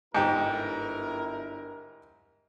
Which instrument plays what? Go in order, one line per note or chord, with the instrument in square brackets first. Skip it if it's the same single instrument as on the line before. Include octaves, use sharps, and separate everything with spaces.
[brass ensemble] G1 E4 A#4 [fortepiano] G#2 G4